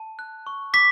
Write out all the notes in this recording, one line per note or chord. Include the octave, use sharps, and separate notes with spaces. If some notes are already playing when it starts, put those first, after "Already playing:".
Already playing: A5
F#6
C#6
D6 B6